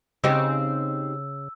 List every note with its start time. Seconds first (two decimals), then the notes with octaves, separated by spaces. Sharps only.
0.24 C#3 C4 D#4 G4 E6